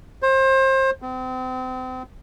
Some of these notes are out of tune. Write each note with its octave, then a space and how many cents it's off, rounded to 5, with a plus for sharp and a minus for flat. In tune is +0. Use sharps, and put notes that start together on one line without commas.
C5 +30
C4 -35